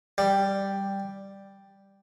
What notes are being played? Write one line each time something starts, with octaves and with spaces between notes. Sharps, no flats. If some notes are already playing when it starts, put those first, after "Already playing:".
G3